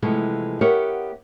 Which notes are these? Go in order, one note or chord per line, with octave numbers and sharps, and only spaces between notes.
C3 E3 F3 G#3 A3 B3
B3 G4 A#4 C#5 E5 F#5